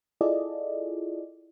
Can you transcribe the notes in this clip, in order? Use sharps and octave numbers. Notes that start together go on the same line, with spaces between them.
E4 F4 G#4 A4 D5 D#5